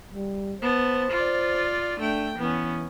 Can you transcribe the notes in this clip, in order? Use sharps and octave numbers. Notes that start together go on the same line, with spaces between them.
G3
B3 C5 A5
F4 D5
A3 D4 G5
E3 B3 C#4